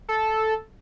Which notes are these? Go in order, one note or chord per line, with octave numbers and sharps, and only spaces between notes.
A4